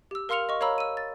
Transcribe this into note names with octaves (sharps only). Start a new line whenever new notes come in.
G4 E6
A#4 F5 C6 F6 C#7 F7
D#5 C#6
A#4 C#5 F5 A#5 B5 E6
E6 D#7
A6